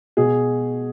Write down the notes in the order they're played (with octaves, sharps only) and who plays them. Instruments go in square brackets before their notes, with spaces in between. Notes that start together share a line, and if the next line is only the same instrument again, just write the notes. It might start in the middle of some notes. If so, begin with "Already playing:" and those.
[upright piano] B2 G#4